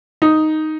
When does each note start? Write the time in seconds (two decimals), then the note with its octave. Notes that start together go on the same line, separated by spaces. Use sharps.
0.22 D#4